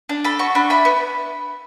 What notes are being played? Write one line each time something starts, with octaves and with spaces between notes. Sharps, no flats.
D4
A4 B5
F#4 C#6
D4 B5
E4 B5
B3